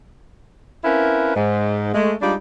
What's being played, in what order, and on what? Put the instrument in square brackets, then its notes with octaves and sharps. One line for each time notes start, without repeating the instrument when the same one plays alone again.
[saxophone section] C4 C#4 E4 A#4 B4 F5
G#2
G#3 A3
G3 G#3 D4 D#4 F4 D5